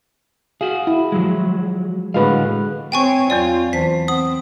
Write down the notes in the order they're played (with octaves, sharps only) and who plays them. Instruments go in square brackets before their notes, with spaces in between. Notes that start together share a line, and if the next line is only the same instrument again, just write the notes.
[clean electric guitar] F#4 G#4 [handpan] F5
[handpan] E4
[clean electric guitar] F3 F#3 G#3
[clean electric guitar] A2 D3 F5 [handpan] G#3 F#4 B4
[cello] C4 C#5 [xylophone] G5 G#5 C#6
[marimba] E2 F#3 C4 [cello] F4 [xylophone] D5
[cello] E2 [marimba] C5 A5 [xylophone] B6
[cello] C4 [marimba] F#5 [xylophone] D#6